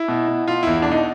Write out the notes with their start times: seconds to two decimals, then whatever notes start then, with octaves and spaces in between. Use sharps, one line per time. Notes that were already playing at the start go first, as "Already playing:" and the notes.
Already playing: E4
0.08 B2
0.28 B2
0.47 B2 F4
0.63 E2 E4
0.82 D4
0.87 B2 D#4